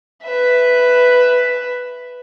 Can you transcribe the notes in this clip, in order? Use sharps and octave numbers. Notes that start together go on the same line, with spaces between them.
B4 E5